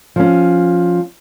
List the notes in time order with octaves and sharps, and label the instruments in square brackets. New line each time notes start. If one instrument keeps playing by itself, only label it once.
[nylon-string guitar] F3 C#4